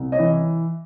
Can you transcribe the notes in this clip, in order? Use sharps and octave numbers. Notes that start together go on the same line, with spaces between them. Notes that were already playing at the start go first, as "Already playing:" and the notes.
Already playing: C2
C#5 D#5
E3